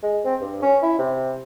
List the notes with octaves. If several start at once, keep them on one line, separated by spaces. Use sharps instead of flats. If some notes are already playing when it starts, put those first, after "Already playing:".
G#3
C4
G2
C#4
E4
C3